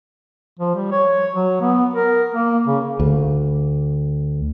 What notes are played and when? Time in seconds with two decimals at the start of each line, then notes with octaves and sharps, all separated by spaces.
0.60 F3
0.75 G3
0.92 C#5
1.34 F#3
1.61 B3
1.94 A#4
2.35 A#3
2.67 C#3
3.00 D2